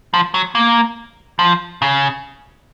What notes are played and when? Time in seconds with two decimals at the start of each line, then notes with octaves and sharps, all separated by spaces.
0.14 F3
0.34 F#3
0.55 A#3
1.39 F3
1.82 C#3